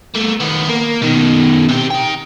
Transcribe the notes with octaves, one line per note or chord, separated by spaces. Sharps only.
A3 A#3
D#2 B3
A#3
B2 D#3
C3 G4
D#4 G5